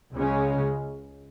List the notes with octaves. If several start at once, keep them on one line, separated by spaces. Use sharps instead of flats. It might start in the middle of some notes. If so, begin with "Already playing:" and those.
C#2 C#3 G#3 C#4